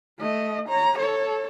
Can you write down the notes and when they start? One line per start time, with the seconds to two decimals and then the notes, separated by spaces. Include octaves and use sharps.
0.20 A3 D#5
0.68 C#5 A#5
0.98 A4 C#5